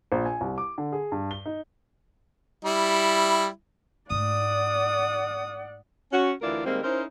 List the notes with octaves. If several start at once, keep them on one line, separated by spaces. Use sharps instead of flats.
A#1
G#5
C2
D6
D3
G#4
G2
G7
D#4
G3 E4
G#2 A3 D5 F#5 D#6
C#4 F#4
D2 E3 E4 F4 A#4 D5
D#3 G3 G#3 A#3 C4
C#4 D#4 E4 A#4 C5